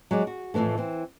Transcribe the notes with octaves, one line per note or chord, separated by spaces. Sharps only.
F#3 G#3 D5
F#4
F2 A2 D3 E3 A3
E3 C4